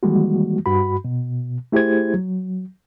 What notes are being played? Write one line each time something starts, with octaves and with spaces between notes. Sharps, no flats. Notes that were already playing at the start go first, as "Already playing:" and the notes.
D#3 E3 G3 G#3 A#3 F#4
G2 F#4 B5
B2
A3 E4 G4 G#4 C5 G#6
F#3